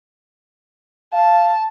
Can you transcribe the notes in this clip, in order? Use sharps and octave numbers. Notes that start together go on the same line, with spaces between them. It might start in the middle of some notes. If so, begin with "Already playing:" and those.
F5 A5